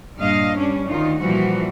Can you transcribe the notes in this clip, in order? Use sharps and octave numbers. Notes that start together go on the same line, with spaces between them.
G2 A#2 D#5 F5
G3 C#4 D4
D2 D#3 D#4 F4
A#2 E3 F3 G3 F#4